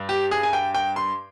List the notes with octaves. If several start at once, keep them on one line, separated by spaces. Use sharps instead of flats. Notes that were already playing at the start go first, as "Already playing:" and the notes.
Already playing: G2
G4
G#4
G#5
G5
G5
C6